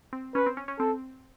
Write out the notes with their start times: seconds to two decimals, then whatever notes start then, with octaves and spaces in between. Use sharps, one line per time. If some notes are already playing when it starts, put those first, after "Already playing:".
0.13 C4
0.35 C#4 B4
0.46 C4
0.57 C#4
0.68 C#4
0.79 C4 A4